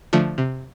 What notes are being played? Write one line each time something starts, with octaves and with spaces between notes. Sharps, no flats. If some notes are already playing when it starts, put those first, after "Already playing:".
D3 F3 A3
C3